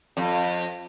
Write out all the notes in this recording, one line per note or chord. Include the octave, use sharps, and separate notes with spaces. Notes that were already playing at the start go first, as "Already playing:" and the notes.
F2